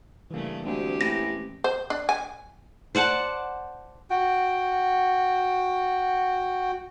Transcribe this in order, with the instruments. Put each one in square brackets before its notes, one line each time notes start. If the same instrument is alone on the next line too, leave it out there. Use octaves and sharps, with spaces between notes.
[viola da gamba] G2 C#3 A3 [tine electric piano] E3 A#3
[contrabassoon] D2 [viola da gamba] G#3 C4 G4
[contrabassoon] A1 [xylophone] A#6
[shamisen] C5
D4
G#5
[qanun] C5 D5 F#5 A5
[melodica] F#4 G5